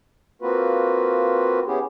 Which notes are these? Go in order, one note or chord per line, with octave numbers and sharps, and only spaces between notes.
A#3 C4 F4 F#4 B4
B3 C#4 E4 G4 G#4